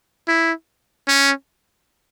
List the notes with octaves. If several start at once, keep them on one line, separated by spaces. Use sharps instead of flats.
E4
C#4